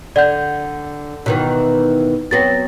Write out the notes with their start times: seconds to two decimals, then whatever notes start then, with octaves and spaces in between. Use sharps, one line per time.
0.16 D3 D5 F#5 G6
1.26 B2 D#3 E3
2.31 F#3 B3 C4 A6 A#6